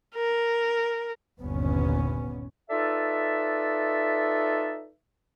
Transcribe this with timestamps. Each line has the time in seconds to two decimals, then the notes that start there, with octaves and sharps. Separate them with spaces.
0.15 A#4
1.40 G1 D#2 A#2 B3 C#4
2.70 D#4 F4 A4 B4 D5 E5